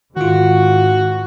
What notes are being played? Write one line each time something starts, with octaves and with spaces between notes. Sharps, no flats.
G#2 D#3 F4 F#4